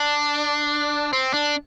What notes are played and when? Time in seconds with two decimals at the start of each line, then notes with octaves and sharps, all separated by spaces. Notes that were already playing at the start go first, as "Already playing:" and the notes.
Already playing: D4
1.13 C4
1.34 D4